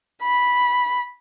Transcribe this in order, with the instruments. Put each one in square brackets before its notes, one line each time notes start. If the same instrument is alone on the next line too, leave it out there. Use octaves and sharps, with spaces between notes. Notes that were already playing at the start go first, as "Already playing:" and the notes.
[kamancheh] B5